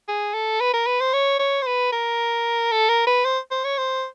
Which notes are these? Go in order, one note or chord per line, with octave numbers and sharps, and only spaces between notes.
G#4
A4
B4
A#4
B4
C5
C#5
C#5
C5
B4
A#4
A4
A#4
B4
C5
C5
C#5
C5